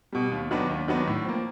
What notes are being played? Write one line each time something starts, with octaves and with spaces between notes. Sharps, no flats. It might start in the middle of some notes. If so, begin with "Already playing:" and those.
B2 G3
D#2
D#3 F#3 B3 D4
D#2
D#3 F#3 B3 D4
A2
F3 A#3